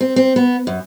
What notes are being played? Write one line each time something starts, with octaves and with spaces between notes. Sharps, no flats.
C4
C4
B3
F#2